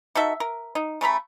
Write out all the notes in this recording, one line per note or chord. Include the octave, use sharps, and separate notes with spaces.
D#4 F#4 A4 E5
A#4
D#4
C#3 A3 A#5 B5